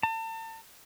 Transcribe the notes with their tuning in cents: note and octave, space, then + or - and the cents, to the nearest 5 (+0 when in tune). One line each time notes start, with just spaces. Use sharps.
A5 +40